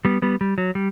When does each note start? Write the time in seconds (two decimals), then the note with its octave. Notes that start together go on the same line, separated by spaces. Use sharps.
0.05 G3 B3
0.22 G3 B3
0.41 G3
0.58 F#3
0.75 G3